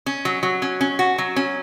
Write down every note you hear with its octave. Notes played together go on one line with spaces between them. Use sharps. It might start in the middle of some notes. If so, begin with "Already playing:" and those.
C#4
F#3
F#3
C#4
C#4
F#4
F#3
C#4